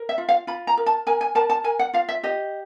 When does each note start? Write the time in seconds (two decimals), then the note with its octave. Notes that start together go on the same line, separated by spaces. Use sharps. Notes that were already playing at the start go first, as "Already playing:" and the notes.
Already playing: A#4
0.09 E5
0.18 F4
0.29 F5
0.47 F4 B5
0.67 A#5
0.77 A#4
0.86 A5
1.07 A#4 G#5
1.21 G#5
1.35 A#4 A5
1.50 A5
1.64 A#4 G#5
1.79 F#5
1.93 F4 F5
2.09 E5
2.23 G4 D#5